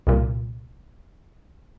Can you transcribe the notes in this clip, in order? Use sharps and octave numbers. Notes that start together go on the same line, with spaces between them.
C2 A#2